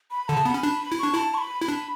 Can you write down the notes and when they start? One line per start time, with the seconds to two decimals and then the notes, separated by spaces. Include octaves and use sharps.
0.11 B5
0.28 D3 A5
0.37 C#3
0.45 B3 B5
0.54 C#4
0.63 D4
0.92 E4
0.99 D4 C#6
1.14 E4 A5
1.34 C#6
1.38 B5
1.62 E4
1.68 D4